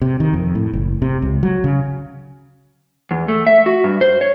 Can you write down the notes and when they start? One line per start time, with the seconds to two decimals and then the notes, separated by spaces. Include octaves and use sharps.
0.02 C3
0.20 D#3
0.33 F2
0.55 A2
0.73 F#1
1.02 C3
1.22 C#2
1.43 F#3
1.64 C#3
3.11 E2
3.28 A3
3.47 E5
3.66 F#4
3.84 G2
4.01 C5
4.21 C#5